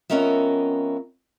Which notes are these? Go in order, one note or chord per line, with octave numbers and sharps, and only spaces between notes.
F2 B3 C#4 A#4 D#5 E5